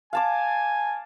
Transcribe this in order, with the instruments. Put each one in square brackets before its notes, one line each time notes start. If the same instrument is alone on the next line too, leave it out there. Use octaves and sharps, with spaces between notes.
[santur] F5 A5 D6 [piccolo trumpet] G#5